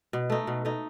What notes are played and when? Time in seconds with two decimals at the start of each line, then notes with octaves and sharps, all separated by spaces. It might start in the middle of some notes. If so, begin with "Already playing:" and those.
0.13 B2
0.30 A3 D#4
0.47 B2
0.65 A3 D#4